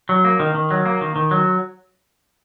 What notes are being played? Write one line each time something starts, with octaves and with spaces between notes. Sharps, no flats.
F#3
A#3
D#3
D#3
F#3
A#3
D#3
D#3
F#3